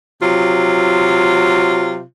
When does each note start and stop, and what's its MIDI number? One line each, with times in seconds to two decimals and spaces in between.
0.23 2.03 48
0.23 2.03 54
0.23 2.03 65